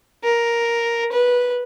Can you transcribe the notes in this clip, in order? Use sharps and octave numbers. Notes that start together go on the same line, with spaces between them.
A#4
B4